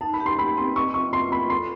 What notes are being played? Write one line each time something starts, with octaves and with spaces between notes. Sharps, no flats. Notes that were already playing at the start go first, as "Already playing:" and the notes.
D#4 A5
B5
G4
C6
G4 B5
C4 C6
D#5 C#6
F4 C#6
F4 C6
F4 B5
A4 C6